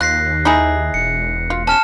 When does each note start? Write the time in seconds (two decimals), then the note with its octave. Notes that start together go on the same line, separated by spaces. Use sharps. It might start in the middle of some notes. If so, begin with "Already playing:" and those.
0.01 D#2 F4 F#6 A#6 C7
0.45 D#4 E4 G#4
0.94 E1 C#7
1.50 F4
1.67 C#4 A5 F6 E7